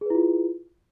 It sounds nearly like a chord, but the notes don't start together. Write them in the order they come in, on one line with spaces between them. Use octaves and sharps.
G#4 B4 E4 F4